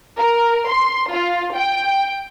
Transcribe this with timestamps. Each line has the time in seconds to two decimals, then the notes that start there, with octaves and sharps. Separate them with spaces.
0.19 A#4
0.69 C6
1.13 F4
1.55 G5